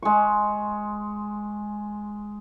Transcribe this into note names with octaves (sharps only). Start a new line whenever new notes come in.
G#3 C#6